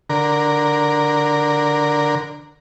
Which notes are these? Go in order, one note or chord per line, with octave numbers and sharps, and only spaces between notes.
D3 A#4